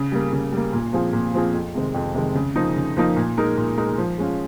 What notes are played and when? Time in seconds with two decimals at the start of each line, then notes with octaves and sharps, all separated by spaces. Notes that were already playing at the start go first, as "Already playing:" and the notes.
Already playing: C#3
0.12 G3 A#3
0.33 C#3
0.53 G3 A#3
0.73 A#2
0.93 F3 C4 F4 G#4
1.13 A#2
1.34 F3 C4 F4 G#4
1.54 F2
1.75 C3 D#3 G#3 C4
1.94 F2
2.15 C3 D#3 G#3 C4
2.35 C#3
2.56 F3 A#3 D#4
2.76 C#3
2.97 F3 A#3 D#4
3.16 A#2
3.38 G#3 D#4 A#4
3.58 A#2
3.78 G#3 D#4 A#4
3.98 F3
4.18 G#3 C#4 F4